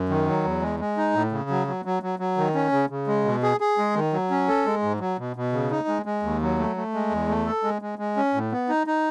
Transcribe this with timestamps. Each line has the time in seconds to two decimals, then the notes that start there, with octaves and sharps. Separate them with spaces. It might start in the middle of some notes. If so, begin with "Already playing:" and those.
Already playing: F#2
0.09 D#3
0.27 F#3
0.44 E2
0.62 G#3
0.79 G#3
0.97 D#4
1.15 A2
1.32 C#3
1.50 F#3
1.67 F#3
1.85 F#3
2.03 F#3
2.19 F#3
2.37 D#3
2.55 C#4
2.72 C#3
2.90 C#3
3.07 G#3
3.24 B2
3.43 G#4
3.60 G#4
3.78 G#3
3.95 D#3
4.13 F#3
4.31 C#4
4.48 A4
4.66 G#3
4.82 G#2
5.00 F#3
5.19 B2
5.36 B2
5.53 C#3
5.71 D#4
5.88 G#3
6.06 G#3
6.23 D#2
6.41 F#3
6.59 A3
6.77 A3
6.94 G#3
7.11 E2
7.28 A3
7.46 A4
7.64 G#3
7.82 G#3
7.99 G#3
8.17 C#4
8.34 A2
8.52 B3
8.69 D#4
8.87 D#4